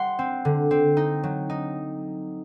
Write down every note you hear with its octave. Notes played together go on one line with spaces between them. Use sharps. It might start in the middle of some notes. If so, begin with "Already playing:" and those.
Already playing: G3 F#5 C6
C4
D3
C4
D#4
F#3
D#4